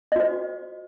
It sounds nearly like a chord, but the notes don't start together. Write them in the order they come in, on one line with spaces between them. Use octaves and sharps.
D#5 F#4 C5